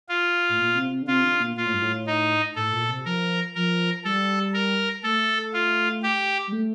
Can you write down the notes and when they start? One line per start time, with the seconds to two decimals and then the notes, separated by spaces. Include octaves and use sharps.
0.09 F4
0.49 A2
0.58 A#2
0.75 C3
0.91 C3
1.02 D3
1.07 C3 F4
1.24 D3
1.40 A#2
1.56 A#2 F4
1.66 A2
1.74 G2
1.82 A2
2.07 D#4
2.55 A2 A4
2.72 A#2
2.88 C3
3.05 F3 A#4
3.55 F3 A#4
4.04 G3 A4
4.54 A#4
5.03 A3 A4
5.53 F4
6.03 G4
6.47 G3
6.52 A3